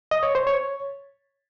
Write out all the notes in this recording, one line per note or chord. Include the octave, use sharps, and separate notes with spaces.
D#5
C#5
C5
C#5